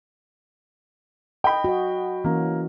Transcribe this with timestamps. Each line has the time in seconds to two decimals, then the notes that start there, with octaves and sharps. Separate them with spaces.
1.44 D#5 G5 B5
1.64 F#4 D#5
2.25 E3 A#3 C#4